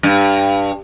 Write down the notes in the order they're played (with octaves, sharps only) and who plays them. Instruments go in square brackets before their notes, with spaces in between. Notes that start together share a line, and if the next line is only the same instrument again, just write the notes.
[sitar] G2